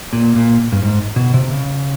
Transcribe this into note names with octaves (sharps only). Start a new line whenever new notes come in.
A#2
A#2
G2
G#2
B2
C3
C#3